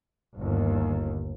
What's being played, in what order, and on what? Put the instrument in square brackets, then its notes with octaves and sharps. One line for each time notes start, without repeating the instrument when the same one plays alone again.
[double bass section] G1 D#2